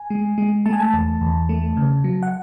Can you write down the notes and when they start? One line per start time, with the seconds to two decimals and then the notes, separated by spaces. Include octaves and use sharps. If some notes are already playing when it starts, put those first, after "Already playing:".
Already playing: G#5
0.10 G#3
0.38 G#3
0.66 A3 A5
0.73 G#5
0.80 A5
0.94 E2
1.21 E2
1.49 A3
1.77 C#3
2.04 F#3
2.23 F#5